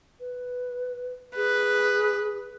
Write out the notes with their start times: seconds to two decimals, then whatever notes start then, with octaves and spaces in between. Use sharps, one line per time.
0.20 B4
1.36 G#4 B4